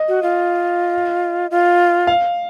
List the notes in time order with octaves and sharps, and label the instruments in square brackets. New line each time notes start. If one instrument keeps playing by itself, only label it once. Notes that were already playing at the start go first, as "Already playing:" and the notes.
Already playing: [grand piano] D#5
[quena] F#4
F4
F4
[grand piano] F5